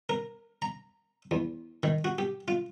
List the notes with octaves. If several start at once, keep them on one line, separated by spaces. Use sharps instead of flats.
A#4
A#5
E2
D#3
F#4
G4
F4